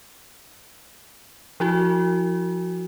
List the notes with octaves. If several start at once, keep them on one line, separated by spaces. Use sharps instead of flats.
F3 E4 F#4